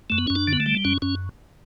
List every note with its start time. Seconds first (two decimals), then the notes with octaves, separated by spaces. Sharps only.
0.10 F#2 A3
0.18 B3
0.27 F#2 C#4
0.35 D4
0.48 D3
0.53 B3
0.60 A3
0.66 G3
0.85 F#2 C#4
1.02 F#2 C#4